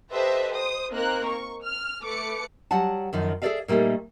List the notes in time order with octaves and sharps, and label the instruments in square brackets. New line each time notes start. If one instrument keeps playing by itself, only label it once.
[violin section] G4 A4 B4 C5 D#5 E5
C5 D#6
A#3 C4 D#4 A#4 F#6
C#6
F6
A3 B4 D6 C#7
[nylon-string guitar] F#3 G3 F#5 A5
F#2 D#3 F3
G#4 A4 C#5 D5 E5 F5
A#2 G3 A3 A#3 D#4